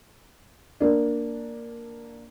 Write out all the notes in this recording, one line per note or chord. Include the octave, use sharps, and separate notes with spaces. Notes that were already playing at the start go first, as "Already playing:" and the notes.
A#3 D4